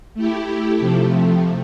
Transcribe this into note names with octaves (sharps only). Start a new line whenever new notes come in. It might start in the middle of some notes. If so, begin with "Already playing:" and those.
A3 E4 G4
C3 F3 A3